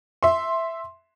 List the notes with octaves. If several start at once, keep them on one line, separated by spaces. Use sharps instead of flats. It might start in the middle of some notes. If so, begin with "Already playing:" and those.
E5 C6